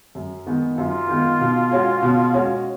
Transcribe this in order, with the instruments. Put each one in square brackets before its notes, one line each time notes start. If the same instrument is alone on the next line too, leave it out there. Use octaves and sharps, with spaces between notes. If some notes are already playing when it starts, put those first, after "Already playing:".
[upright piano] F#2
D#3 G#3 B3
[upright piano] F#2 [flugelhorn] F4
[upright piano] D#3 G#3 B3
B2
G#3 C#4 F#4
B2
G#3 C#4 F#4